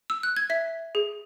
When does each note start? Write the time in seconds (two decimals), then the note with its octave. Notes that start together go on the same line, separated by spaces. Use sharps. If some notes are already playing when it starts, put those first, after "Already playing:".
0.10 E6
0.23 F#6
0.37 G#6
0.50 E5 B6
0.95 G#4